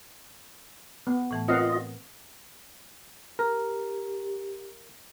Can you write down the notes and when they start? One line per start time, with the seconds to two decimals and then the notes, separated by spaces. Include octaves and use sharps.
1.07 B3
1.31 A2 E3 A3
1.48 C4 F4 A#4 B4 C#5 D#5 F5 F#5
3.39 G4 A#4